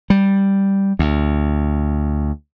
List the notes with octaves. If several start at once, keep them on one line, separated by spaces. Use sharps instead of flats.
G3
D2